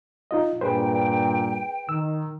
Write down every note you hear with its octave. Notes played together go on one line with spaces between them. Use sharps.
D#4 F4 D#5
G2 A#2 G#4 B4 C5 G5
D#3 E6